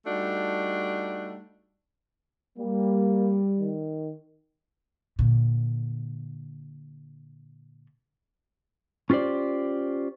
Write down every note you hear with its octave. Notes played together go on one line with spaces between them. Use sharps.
G3 A3 D4 D#4 F#4
G3 A#3
D#3
A#2 D3
C#4 F4 G4 C5 D5